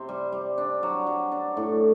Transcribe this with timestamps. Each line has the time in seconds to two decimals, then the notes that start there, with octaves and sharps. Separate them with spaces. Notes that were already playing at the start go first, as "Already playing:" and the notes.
Already playing: C3 C4
0.09 G3
0.32 G3
0.58 D4
0.83 F#3
1.07 F#3
1.32 D4
1.57 A2